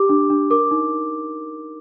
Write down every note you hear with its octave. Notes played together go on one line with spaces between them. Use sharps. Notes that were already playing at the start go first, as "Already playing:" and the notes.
Already playing: G4 D6
D4
D4
A#4 D6
D#4